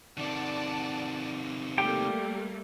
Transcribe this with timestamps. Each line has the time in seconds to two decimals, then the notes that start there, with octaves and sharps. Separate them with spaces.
0.17 C3 D#3 D5 F#5 A5
1.78 G3 A3 A#3 G4 G5